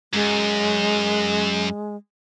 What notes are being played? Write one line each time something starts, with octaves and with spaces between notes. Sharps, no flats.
F#2 G#3